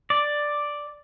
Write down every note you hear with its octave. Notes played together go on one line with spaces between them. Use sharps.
D5